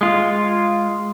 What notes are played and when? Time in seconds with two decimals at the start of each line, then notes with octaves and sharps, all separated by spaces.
0.01 G#3 F4